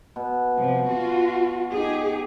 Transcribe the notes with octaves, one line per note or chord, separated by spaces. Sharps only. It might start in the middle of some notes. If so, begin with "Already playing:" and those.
B2
C3 F3
F4 F#4
D#4 G4 G#4